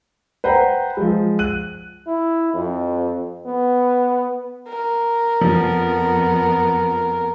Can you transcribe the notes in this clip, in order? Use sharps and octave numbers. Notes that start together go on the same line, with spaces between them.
B4 C5 F#5 G5 A#5
F3 G#3
F#6 D#7
E4
F2
B3
A#4
F2 F3 B3